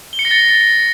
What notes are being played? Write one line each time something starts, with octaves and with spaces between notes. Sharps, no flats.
G7
C#7
A#6
A6